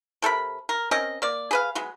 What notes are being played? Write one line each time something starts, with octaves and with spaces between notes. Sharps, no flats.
C3 A4 A#4 B5
A#4
C4 C#4 A#4 D#5
A#3 D5
G#4 B4 F5
F#3 G#3 B3